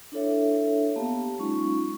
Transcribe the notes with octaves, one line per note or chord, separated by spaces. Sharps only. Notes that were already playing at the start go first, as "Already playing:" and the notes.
D4 E4 A4 C#5 E5
A#3 B3 G4 F5 A5
F#3 G#3 C#4 D#4 F4 C#6